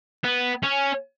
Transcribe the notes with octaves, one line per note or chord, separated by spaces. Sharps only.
B3
C#4